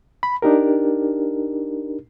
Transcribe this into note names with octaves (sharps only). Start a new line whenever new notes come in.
B5
D4 D#4 G4 A#4